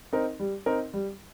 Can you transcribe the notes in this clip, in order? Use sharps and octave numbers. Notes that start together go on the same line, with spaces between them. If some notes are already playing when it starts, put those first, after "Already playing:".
C4 D#4 A#4
G3
C4 D#4 A#4
G3